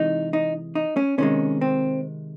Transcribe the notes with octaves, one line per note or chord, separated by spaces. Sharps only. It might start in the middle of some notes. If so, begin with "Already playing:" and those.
Already playing: C3 E3 G#3 D#4
D#4
D#4
C#4
C3 D#3 G#3 C#4
C4